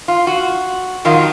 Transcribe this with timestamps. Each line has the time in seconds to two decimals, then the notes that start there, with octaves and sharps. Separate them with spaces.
0.08 F4
0.27 F#4
1.05 F2 D#3 F#3 F4